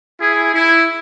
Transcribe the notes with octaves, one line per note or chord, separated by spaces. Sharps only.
E4 G#4
E4